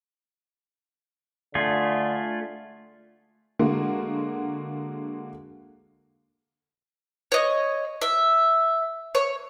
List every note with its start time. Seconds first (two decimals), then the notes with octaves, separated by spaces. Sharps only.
1.55 D3 A3 F4 G#4
3.59 D3 G#3 A#3 F#4
7.32 C#5 D#5
8.02 E5
9.15 C#5